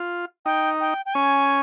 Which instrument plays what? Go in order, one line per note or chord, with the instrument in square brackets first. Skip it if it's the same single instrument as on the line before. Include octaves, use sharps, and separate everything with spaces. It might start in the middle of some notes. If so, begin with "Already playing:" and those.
Already playing: [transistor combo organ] F4
[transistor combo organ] D#4 [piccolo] G5
[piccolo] G5
G5
[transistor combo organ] C#4 [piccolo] G#5